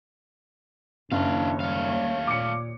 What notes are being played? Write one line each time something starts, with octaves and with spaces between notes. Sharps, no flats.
F#1 D#2 D4 E4 C#5 F5
G3 A3 F5
A#2 D6 C#7